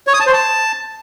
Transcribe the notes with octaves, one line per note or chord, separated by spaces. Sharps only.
C#5
D#6
A5
C5
A5